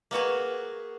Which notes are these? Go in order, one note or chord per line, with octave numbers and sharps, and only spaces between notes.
A#3 B3 F#4 G#4